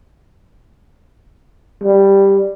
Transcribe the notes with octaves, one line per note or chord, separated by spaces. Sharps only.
G3